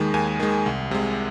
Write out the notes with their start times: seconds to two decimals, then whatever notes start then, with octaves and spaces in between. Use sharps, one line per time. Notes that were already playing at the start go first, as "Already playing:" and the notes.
Already playing: D#2 D#3 G#3
0.14 D#2 G#5
0.39 D#3 G#3
0.66 C2
0.91 C3 G#3